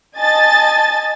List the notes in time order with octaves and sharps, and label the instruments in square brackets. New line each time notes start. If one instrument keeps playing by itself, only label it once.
[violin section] D#5 G#5 A5 A6